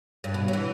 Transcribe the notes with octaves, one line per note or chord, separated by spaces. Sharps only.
G2
B2
F#3
E3